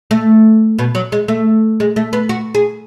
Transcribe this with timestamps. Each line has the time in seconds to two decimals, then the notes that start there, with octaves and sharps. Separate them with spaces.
0.11 A3
0.79 B2
0.95 F#3
1.12 G#3
1.28 A3
1.80 G#3
1.96 A3
2.13 B3
2.29 F#4
2.55 G#4